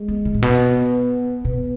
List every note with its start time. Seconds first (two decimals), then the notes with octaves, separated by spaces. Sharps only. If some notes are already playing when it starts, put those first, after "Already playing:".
Already playing: G#3
0.08 B3
0.25 C#3
0.34 A2
0.42 B2 B3
1.44 B2 B3